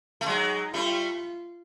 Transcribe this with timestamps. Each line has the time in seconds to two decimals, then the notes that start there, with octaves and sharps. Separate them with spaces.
0.21 A3
0.26 F#3 G#3 D#4
0.74 G3 A3 F4